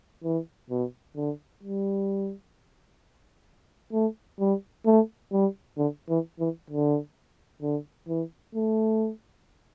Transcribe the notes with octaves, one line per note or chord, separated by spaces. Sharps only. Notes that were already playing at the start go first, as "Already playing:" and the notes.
E3
B2
D3
G3
A3
G3
A3
G3
D3
E3
E3
D3
D3
E3
A3